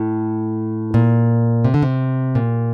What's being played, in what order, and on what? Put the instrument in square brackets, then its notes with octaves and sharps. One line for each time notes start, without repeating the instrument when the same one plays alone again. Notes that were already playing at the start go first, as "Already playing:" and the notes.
Already playing: [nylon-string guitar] A2
A#2
C3
D3
C3
A#2